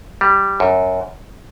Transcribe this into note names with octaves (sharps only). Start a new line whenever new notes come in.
G3
F#2